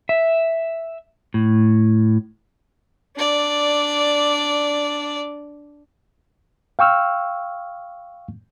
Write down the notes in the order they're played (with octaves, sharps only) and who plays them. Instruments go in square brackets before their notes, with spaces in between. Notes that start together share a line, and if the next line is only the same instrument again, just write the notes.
[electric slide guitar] E5
A2
[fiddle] D4 D5
[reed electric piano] F5 G5 C#6 E6 F6